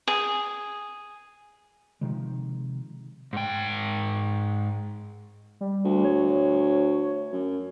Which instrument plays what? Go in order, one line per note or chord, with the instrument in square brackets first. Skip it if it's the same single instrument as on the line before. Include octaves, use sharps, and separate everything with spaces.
[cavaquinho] G#4
[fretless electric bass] C3 D#3 F3 G#3
[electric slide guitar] G#2 G5
[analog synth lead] G3
[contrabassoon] D2
[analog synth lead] C#5
[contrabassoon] F#2